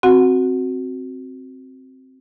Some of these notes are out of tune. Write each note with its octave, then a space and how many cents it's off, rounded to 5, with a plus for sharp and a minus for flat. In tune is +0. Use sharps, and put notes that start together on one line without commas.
C4 +0 F#4 +0 F#5 -15